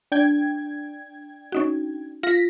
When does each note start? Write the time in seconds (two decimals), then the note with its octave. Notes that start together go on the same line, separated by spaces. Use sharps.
0.12 D4 G5 G#6
1.52 C#4 D#4 F#4
2.23 F4 A#6 B6